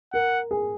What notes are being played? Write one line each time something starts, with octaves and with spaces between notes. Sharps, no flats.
A#4 F#5
G#4